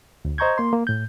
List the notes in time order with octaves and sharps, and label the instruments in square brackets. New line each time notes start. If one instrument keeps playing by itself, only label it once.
[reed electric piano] D2
C5 D#5 A#5 C#6 G6 G#6
A#3 C6
A#3
A2 G6